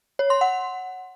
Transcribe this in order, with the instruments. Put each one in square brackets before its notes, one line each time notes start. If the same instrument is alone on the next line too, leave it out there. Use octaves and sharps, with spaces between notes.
[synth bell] C#5
C6
F#5